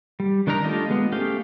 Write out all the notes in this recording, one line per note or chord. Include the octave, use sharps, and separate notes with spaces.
G3
D#3 D4 D#4 A#4 A#5
A3 D4 F4 G4 D#5
G#3 B3
A3 C#4 G4 F5 G5